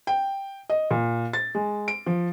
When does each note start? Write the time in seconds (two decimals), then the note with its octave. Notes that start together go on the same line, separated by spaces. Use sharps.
0.07 G5
0.70 D#5
0.91 A#2
1.33 A6
1.55 G#3
1.88 D7
2.07 F3